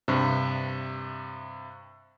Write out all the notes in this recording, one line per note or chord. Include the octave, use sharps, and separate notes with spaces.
G2 C3